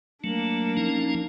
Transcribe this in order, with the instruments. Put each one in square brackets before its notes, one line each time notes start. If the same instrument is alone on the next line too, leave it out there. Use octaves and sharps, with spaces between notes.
[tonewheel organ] F#3 A3 [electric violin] A#3 D4
[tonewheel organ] F3 C#4 D#4